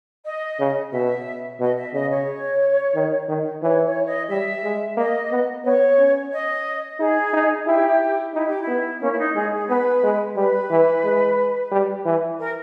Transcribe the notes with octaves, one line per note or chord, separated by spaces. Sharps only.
D#5
C#3
B2 E5
B2 D#5
E5
C#3 D#5
C#5
D#3
D#3
E3 C#5
C#5
D#5
G3 E5
G#3
A#3 D#5
B3
B3 C#5
C#4
D#5
D#4 G#4
D#4
E4 G4
D#4 E4
G4
E4
B3
A#3 C#4
E4
D#4
G#3 G#4
G#4
B3 B4
G#3
G3 B4
E3
G#3
G3
E3
A#4